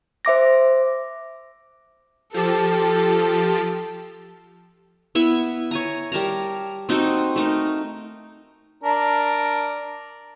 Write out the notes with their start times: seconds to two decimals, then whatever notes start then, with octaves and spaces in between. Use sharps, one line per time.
0.25 C5 E5 D6 A#6
2.34 F3 G4 A4 A5
5.15 B3 E4 E5
5.71 C#5 G#5 A#5
6.12 G3 A#4 A5 A#5
6.89 C4 D#4 F#4 A4
7.36 A3 D#4 A#4
8.84 D4 A#4 A#5